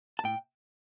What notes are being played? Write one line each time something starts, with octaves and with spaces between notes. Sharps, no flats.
A5
A2 G5